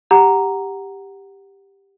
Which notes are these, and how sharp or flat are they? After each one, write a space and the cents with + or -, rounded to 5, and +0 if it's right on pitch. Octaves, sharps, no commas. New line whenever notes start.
G4 +5 F#5 +5 A#5 +0